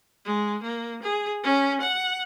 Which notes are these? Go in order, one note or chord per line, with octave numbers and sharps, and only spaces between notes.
G#3
A#3
G#4
C#4
F#5